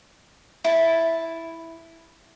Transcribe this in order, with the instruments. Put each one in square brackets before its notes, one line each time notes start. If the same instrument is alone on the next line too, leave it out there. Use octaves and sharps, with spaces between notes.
[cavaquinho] E4 A5